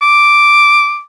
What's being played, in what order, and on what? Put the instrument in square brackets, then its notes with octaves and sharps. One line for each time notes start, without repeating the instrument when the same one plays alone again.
[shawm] D6